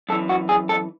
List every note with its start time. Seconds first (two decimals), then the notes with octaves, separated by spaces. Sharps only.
0.09 F#2 A4
0.12 E3
0.29 F#4
0.49 G#4
0.69 A4